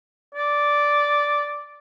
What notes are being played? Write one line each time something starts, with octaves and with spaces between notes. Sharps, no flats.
D5